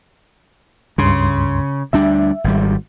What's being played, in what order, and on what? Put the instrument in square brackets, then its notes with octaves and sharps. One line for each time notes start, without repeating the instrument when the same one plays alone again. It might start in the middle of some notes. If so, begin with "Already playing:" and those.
[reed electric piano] C#2 G2 C6 [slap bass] C#3
[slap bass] D2 G3 D4 [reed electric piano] E5
[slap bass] G#1 G3